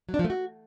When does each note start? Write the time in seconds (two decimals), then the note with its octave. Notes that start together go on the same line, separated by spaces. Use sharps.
0.09 F#3
0.14 D4
0.19 F3
0.25 A3
0.30 F#4